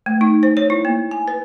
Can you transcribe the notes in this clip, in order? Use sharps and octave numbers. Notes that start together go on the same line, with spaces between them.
A3
D#4
C5
C#5
E4
A#3
G#5
B4